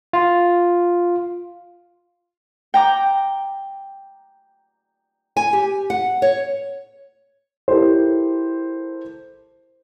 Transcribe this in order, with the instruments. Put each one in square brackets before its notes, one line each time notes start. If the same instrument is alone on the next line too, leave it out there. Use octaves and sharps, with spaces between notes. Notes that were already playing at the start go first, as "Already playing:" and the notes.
[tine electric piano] F4
[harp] G5 A#5 D6
[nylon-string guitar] G#5
G4
F#5
C#5
[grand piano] E4 G4 A4 A#4 C5